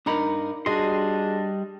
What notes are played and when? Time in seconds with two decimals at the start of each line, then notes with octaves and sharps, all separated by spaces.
0.06 G2 D4 D#4 A#4 A#5 B5
0.66 G3 D4 F#4 G#4 D#5 C6